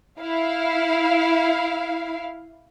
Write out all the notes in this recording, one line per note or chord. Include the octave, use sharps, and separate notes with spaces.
E4 F5